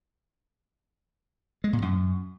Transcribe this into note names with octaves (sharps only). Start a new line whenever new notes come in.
G#3
A#2
F#2